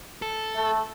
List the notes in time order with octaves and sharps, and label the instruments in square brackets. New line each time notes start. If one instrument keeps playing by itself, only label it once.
[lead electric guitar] A4
[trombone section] A3